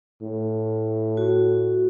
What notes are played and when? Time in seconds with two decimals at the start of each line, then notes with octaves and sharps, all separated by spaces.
0.22 A2
1.17 F#4